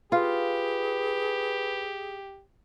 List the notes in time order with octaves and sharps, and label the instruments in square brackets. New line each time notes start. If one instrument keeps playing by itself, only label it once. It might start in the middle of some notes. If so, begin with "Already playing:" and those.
[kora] F4 [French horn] G4 [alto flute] G#4 [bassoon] B4